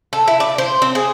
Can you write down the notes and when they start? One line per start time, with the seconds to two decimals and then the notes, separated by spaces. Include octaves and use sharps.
0.13 A4
0.28 E4
0.40 D5
0.58 C5
0.82 C4
0.95 G#4